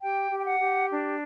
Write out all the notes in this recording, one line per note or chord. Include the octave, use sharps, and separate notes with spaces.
G4 G5
G4
G5
F#5
G4
D4